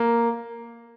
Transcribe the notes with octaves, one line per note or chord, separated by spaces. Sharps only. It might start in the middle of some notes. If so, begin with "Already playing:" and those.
Already playing: A#3